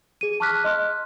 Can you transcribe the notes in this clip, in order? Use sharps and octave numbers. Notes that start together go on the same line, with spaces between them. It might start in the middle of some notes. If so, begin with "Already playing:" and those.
G#4 D#7
A5 C#6 D6 F6 F#6 B6
D#5 C6 F6 F#6